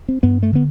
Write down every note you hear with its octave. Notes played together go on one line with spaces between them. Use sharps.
C4
G2 B3
A3
D3 B3